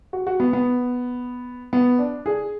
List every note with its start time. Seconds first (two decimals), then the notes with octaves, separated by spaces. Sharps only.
0.13 F#4
0.27 F#4
0.40 B3
0.53 B3
1.73 B3
1.99 D4
2.26 G#4